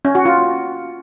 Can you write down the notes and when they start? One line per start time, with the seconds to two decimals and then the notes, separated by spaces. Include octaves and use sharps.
0.05 C#4
0.15 F#4
0.25 F4